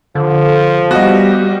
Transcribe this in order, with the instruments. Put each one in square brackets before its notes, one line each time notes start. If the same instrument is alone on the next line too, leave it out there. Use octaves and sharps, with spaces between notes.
[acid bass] D3 [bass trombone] F3
[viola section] G3 [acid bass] B3 [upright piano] F#4 D#5